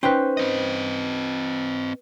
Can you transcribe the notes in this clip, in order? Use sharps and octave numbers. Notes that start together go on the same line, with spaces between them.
C#4 D#4 B4 C5 G5
C4 D#5